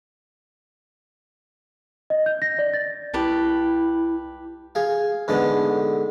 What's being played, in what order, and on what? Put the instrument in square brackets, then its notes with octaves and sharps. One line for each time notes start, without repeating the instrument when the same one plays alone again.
[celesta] D#5
G6
A#6
D5
A6
[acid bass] C2 [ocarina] E4 [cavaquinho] G4 B4 A5
[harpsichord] G#4 F5
G#2 D3 B3 A4